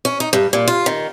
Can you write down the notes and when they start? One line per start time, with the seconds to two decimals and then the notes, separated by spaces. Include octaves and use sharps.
0.05 C#4
0.20 D#4
0.33 G2
0.53 A#2
0.68 F4
0.86 D#3